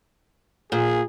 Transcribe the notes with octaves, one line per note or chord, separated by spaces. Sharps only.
A#2 G#4